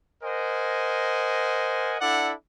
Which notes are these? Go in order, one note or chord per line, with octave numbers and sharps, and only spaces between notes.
A#4 C5 D#5 F#5 G#5
D4 E4 A4 D5 F#5